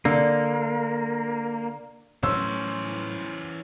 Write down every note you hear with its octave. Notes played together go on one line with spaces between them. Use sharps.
D3 A#3
A2 E3 F#3 A3 C#4 C5 C6 E6